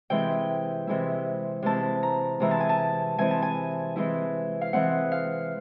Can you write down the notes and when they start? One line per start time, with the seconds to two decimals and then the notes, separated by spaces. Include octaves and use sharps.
0.10 C3 E3 G#3 C4 E4 G5
0.87 C3 E3 G#3 C4 E4
1.62 C3 E3 G#3 C4 E4 A5
2.03 A#5
2.40 C3 E3 G#3 C4 E4 A#5
2.51 A5
2.60 G#5
2.69 A5
3.18 E3 G#3 C4 E4 G#5
3.31 A5
3.42 G#5
3.96 E3 G#3 C4 E4
4.61 F5
4.73 E3 G#3 C4 E4 F#5
5.12 F5